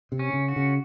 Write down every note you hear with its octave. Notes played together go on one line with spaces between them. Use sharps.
C3
C#4
C#3
F#4
C#3